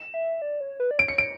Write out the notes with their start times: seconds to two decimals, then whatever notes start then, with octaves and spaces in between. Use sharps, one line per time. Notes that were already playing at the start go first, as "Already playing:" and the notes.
Already playing: E7
0.14 E5
0.42 D5
0.60 C#5
0.80 B4
0.91 D5
0.98 C#5 D7
1.08 C#7
1.18 D7